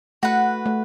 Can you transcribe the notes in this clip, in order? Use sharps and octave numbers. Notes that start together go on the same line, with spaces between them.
A3 F#4 B4 F#5
A3